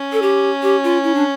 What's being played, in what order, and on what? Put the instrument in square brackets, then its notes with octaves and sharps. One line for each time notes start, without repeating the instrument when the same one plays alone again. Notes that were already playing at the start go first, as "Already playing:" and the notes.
Already playing: [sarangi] C#4
[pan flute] A4
G4
G4
F4
E4
D4